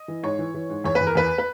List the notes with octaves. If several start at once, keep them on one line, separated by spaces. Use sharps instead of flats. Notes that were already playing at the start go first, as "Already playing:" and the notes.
Already playing: D#5
E3
G#2 C#5
E3
E3
G#2
E2 C#5
B4
E2
A#4
E2 B4
B4